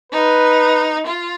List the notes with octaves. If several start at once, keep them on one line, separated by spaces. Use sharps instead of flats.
D#4 B4
F4